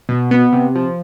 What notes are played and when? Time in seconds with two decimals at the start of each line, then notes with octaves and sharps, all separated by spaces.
0.09 B2
0.31 B3
0.53 C3
0.75 F3